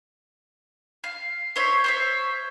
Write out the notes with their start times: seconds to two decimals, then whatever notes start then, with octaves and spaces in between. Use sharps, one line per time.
1.04 F5
1.56 C5 C#5 E5
1.84 C5 C#5 E5